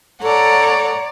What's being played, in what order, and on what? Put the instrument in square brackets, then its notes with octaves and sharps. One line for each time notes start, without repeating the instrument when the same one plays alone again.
[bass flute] A4 [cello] C#5 D5 [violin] F#5 A#5